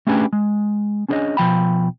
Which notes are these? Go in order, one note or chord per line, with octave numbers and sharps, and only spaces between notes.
A3 C#4 D4 G4 G#4 B4
G#3
C#4 D4 G#4 C5 C#5 D#5
B2 F3 G5 B5